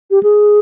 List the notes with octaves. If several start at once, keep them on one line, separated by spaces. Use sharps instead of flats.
G4
G#4